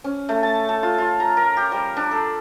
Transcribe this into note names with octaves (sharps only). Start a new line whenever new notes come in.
C#4
A3
A5
A4
F4
F4
A#5
A#4
G4
G3
D4
A4